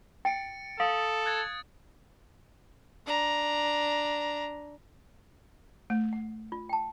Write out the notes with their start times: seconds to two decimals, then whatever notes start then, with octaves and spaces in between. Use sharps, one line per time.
0.25 G5 A6 C#7 D7
0.80 A4 F5 D#6 D7
1.26 F#6 G#6 A6
3.06 D4 A#5
5.90 A3
6.13 F#5
6.52 F4
6.69 G5 A5